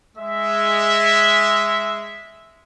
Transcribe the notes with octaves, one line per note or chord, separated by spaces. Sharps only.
G#3 E5